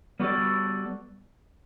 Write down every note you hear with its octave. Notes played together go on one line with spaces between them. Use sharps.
G3 B3 F#4 A4 D5